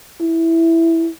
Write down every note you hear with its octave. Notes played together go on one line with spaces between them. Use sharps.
E4